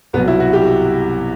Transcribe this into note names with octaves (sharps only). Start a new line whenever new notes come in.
C2 B2 F#3 B3
E4
F#4
G4